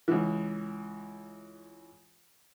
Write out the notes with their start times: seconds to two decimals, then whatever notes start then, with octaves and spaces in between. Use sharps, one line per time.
0.08 C#2 E3